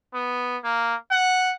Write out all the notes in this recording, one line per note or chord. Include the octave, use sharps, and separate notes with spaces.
B3
A#3
F#5